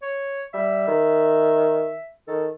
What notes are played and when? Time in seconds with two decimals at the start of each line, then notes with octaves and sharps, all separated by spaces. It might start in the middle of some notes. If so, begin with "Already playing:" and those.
0.03 C#5
0.54 G3 E5
0.88 D#3
2.28 D#3 A4